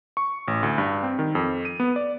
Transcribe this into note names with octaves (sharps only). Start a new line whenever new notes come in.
C#6
A1
D2
G2
C4
D#3
F2
D#7
B3
D5